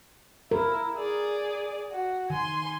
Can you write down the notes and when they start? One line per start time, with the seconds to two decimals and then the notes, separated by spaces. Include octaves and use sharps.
0.51 E4 A#4
0.95 G#4 D5
1.92 F#4
2.30 D#3 G#5 C6